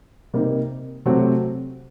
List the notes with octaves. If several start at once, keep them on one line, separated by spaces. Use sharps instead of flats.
C3 G3 A#3 D#4
C3 F#3 A3 C4 F#4